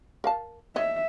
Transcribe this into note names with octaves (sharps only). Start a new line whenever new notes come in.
A#4 F5 A5
C#5 D#5 E5